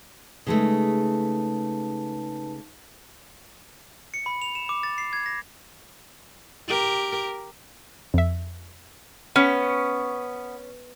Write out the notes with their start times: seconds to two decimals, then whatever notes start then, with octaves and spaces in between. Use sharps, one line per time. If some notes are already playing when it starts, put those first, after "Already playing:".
0.47 C#3 G#3 A3 D#4 B4 A5
4.14 C#7
4.26 B5
4.42 F7
4.55 E7
4.69 D6
4.83 A6
4.98 C7
5.13 G#6
5.26 A#6
6.68 G4 A#4
8.14 F2 E5
9.36 B3 C#4